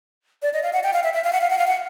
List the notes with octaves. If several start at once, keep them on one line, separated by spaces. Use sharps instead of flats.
D5
D#5
F5
F#5
G5
F5
E5
E5
F5
F#5
F5
F#5
F5
F#5